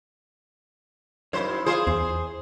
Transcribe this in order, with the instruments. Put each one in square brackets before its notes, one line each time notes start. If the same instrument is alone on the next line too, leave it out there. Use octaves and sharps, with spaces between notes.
[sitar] F#2 C5 [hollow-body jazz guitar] D#4 E4 C#5
[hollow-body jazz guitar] F4 D5 F5 [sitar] G#4 C5
[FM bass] E2 [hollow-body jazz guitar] E3